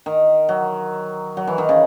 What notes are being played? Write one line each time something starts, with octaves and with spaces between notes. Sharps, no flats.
D#3
F#3
F#3
E3
D#3
C#3